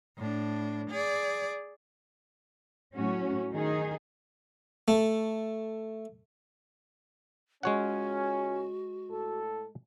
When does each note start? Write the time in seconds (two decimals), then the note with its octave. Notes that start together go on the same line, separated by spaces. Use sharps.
0.17 A2 D4
0.90 G#4 D5
2.94 A2 F#3 C#4 F#4
3.52 D#3 D#4 G#4
4.88 A3
7.63 C#2 G#3 C#4 F#4 C#5 F#5
9.10 A2 A4